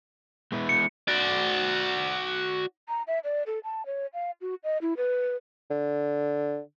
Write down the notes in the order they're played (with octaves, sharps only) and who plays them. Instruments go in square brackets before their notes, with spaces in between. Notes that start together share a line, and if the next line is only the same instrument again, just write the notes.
[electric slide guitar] G#3 B3 E4
[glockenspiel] C#7
[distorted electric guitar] F#4 D5
[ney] A#5
E5
D5
A4
A5
C#5
F5
F#4
D#5
E4
B4
[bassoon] D3